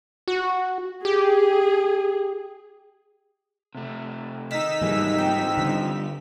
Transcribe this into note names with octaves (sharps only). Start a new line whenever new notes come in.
F#4
G4 G#4
C3 A3
D#3 D#4 E6 B6
G#2 E3 G3 A#3 G#4
F3 C4 G5
D3 G3